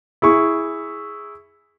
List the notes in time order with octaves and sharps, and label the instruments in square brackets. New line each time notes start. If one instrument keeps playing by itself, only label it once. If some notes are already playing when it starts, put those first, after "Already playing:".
[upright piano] E4 G#4 C#6